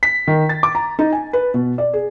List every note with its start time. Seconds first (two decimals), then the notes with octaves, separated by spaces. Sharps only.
0.03 B6
0.27 D#3
0.49 A6
0.63 D6
0.75 A#5
0.99 D#4
1.12 G#5
1.33 B4
1.54 B2
1.78 D5
1.93 G#4